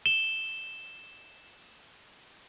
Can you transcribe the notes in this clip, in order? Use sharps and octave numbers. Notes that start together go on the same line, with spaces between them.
E7 G7